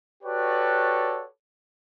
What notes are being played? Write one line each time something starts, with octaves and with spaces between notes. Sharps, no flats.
F#4 G4 A4 B4 C#5 D5